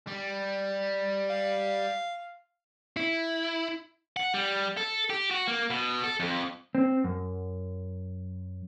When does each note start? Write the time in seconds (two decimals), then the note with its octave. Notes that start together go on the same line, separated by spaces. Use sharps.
0.07 G3
1.30 F5
2.97 E4
4.17 F#5
4.34 G3
4.77 A4
5.10 G4
5.31 F#4
5.48 A#3
5.70 B2
6.04 A4
6.20 F2
6.75 C4
7.04 F#2